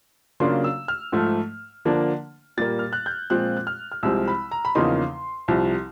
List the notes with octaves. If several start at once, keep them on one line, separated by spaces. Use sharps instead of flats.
C#3 F#3 A#3 D4 F4 C6
E6
F6
G#2 F3 A3
D3 F3 A#3 D4
A#2 G3 A#3 A6
F6
F#6
G6
A#2 F3 G#3 C4 F4 F#6
F#6
F6
F6
C2 C3 F3 G#3 C4 E6
B5
A#5
B5
E2 C#3 F3 A#3 D#4 C6
C2 C3 F3